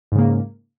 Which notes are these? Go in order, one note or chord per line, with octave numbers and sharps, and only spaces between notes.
G#2 C#3 A#3